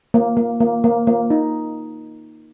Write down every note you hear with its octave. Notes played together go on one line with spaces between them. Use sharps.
A#3
A#3
A#3
A#3
A#3
D#4